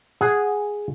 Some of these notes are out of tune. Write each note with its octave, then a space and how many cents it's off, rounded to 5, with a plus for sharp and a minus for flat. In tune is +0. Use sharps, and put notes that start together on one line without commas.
G#4 +0 F#5 +0